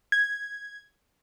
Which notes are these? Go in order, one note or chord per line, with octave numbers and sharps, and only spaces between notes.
G#6